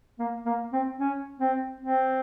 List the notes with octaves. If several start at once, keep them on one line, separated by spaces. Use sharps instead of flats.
A#3
A#3
C4
C#4
C4
C4